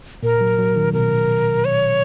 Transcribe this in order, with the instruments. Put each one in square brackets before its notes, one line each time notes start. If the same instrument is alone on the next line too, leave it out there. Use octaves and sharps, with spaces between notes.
[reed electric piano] A#2 [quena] A#4
[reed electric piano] F#3
F#3
D#3
[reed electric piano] B2 [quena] A#4
[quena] C#5